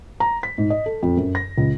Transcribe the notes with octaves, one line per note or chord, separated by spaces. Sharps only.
A#5
B6
G#2
D#5
A4
F2
F#2
A#6
C#2